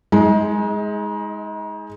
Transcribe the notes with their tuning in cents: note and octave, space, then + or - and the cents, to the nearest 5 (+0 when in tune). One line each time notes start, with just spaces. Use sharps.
G#3 +0 D#4 +35 G#5 +10